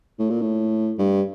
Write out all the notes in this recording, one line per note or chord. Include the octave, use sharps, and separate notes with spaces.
A2
A#2
A2
G2